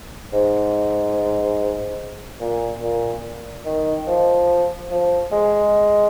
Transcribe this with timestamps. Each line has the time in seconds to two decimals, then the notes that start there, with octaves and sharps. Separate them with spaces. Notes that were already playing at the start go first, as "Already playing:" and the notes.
0.33 G#2
2.41 A#2
2.82 A#2
3.65 D#3
4.07 F3
4.91 F3
5.32 G#3